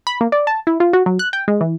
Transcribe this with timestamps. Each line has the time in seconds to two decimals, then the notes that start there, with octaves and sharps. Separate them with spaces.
0.07 B5
0.21 A#3
0.32 D5
0.47 A5
0.67 E4
0.80 F4
0.93 F#4
1.06 F#3
1.19 F#6
1.33 G5
1.48 G#3
1.61 E3